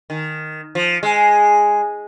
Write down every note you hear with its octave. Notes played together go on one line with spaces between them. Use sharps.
D#3
F3
G#3